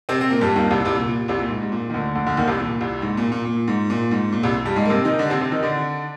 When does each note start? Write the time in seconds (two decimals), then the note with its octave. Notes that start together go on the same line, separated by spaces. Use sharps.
0.09 C3 C4
0.21 C4
0.30 A#2 A#3
0.41 G2 G3
0.56 D#2 D#3
0.71 C2 C3
0.85 C2 C3
0.96 A#2
1.07 A#2
1.28 C2 C3
1.39 A#2
1.50 G#2
1.62 G#2
1.72 A#2
1.90 D#3
1.94 D2 D3
2.15 D2 D3
2.27 D2 D3
2.37 D#2 D#3
2.48 C2 C3
2.58 A#2
2.81 C2 C3
3.02 G#2
3.17 A#2
3.32 A#2
3.45 A#2
3.68 G#2
3.90 A#2
4.11 G#2
4.32 A#2
4.43 C2 C3
4.65 G2 G3
4.76 G#2 G#3
4.85 A#3
4.90 C3 C4
5.05 D#3 D#4
5.19 D3 D4
5.30 C3 C4
5.41 C3 C4
5.52 D#3 D#4
5.63 D3 D4